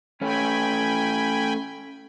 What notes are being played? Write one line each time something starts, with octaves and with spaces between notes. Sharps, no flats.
A3 C#4 G5 G#5 B5